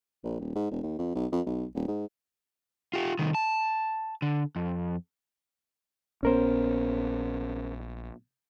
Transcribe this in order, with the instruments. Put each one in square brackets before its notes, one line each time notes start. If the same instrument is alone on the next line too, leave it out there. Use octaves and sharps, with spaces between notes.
[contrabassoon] A#1
D#1
G#2
E1
D#2
F2
B1
F2
B1
D#1
G#2
[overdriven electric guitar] F4 G4
C2 D#3
A5
D3
F2
[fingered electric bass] A#1 B3 [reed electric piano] C#4 A#4 C5